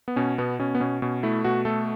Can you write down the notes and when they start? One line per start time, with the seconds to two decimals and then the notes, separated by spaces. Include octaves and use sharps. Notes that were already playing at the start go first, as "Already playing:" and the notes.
0.08 B3
0.16 B2 C#4
0.38 B2 B3
0.59 B2 C#4
0.75 B3
0.80 B2 C#4
1.02 B2 C#4
1.23 A3 E4
1.44 B2 F#4
1.65 A3 A4